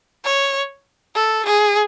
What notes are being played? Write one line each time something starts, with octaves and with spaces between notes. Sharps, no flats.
C#5
A4
G#4